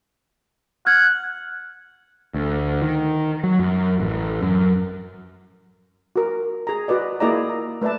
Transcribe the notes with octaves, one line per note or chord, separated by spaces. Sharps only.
F#5 F6 G#6
D2
D#3
F#3
F#2
A1
F#2
F#4 A#4
G#4 A#5
F#4 B4 D5 D#5
A#3 E4 G#4 D5 D#5 A#5
A#5
A3 B4 D5 E5 A5